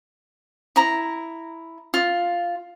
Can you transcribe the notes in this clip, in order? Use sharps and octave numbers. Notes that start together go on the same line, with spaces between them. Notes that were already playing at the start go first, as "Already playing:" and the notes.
E4 A#5
F4